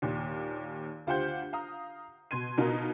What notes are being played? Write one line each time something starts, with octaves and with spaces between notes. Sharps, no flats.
D#2 A#2
D2 F4 G4 C5 F#5 G6
F5 A#5 D#6
B2 C6 G#6 D#7
B2 D#4 F4 F#4 A#4